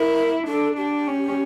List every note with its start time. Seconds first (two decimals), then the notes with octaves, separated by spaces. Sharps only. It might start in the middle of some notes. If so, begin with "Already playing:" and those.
Already playing: E4 A#4
0.48 D4 A4
0.77 D4 G4
1.07 C#4